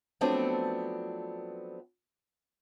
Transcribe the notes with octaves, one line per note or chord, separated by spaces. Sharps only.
F3 F#3 A3 B3 C4 D4